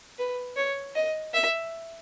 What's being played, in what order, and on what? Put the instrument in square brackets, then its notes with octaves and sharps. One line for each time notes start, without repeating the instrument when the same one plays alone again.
[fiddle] B4
C#5
D#5
E5